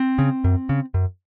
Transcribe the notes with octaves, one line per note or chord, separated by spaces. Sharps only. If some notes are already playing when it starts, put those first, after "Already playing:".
Already playing: C4
C#3
F#2
C#3
F#2